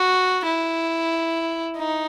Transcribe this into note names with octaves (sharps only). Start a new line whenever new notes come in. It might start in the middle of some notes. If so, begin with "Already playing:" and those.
Already playing: F#4
E4
D#4